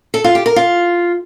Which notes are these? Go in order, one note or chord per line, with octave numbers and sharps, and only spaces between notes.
A4
F4
G4
A#4
F4